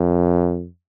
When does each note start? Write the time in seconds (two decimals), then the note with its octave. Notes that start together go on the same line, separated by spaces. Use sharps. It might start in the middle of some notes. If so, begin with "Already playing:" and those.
Already playing: F2